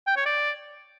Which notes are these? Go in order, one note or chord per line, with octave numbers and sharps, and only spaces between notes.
G5
C#5
D5